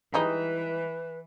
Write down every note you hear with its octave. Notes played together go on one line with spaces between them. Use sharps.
E3 G3 G#3 D#4 B4